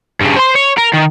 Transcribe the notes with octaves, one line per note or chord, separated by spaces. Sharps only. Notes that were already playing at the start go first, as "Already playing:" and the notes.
G2 C#3
C5 C6
C#5
A#4
D#3